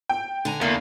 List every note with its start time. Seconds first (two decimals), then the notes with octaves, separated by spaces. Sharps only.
0.09 G5
0.45 D3 G#5 A#5
0.61 E2 A#3